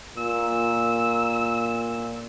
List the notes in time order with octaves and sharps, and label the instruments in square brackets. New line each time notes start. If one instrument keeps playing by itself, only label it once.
[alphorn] A#2 [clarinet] E6